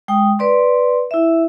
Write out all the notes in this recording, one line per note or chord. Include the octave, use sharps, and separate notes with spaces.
G#3 G5 D#6
B4 D5 C6
E4 E5